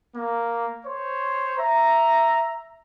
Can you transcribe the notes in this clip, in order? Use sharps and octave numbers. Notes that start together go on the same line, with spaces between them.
A#3
C5 C#5
E5 A#5